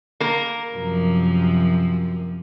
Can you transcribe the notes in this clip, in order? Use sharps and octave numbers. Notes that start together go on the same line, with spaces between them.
A#3 A#4
F#2 C3 F3